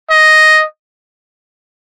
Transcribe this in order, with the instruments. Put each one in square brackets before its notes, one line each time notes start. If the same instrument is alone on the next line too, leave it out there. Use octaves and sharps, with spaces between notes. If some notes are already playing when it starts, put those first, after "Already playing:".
[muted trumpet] D#5